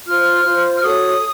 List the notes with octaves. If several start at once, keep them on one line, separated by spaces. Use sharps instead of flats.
F4 C5 F6
F4 C5
F6
F#4 A4 C#5 D#6